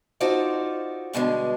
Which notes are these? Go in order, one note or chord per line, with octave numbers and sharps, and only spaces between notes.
D#4 F4 F#4 A4 C5 D5
G2 B2 D3 G#3